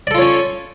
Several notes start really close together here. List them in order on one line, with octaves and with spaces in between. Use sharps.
D5 A4 F4 C#5 C#4